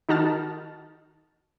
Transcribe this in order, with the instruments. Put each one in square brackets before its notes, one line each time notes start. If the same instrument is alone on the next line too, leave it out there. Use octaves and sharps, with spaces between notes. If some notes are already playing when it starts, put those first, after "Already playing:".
[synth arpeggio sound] D#3 D#4 F#4 A5 F6 A6